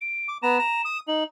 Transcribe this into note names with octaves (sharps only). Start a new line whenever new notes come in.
D7
D6
B3 A#5 E7
A#5
D#6
D#4 F#7